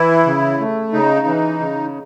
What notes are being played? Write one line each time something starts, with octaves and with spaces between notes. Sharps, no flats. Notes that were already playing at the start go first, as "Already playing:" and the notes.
Already playing: E3 E4
C#3
A3
C#3 D#4
E3
C#3